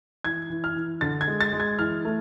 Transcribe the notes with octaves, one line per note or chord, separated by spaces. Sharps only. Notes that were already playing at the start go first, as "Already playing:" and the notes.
E3 G#6
E3
F6
E3
D3 A6
G#6
G#3
A6
G#3
G#6
E3 F6
A3